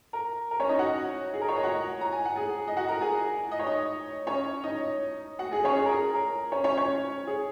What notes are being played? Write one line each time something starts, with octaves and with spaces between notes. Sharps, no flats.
A#4
A#4
C#4 C#5
D#4 D#5
F#4 F#5
G#4
A#4
C#5
D#5
F#4 F#5
A#5
G#5
F#5
G#4 G#5
D#5
F#4 F#5
A#4 A#5
G#4 G#5
D#5
C#5
D#4 D#5
C#4 C#5
D#4 D#5
F#4 F#5
G#4 G#5
C#4 C#5
G#4
A#4
G#4
A#4
C#4 C#5
C#4 C#5
C#4 C#5
G#4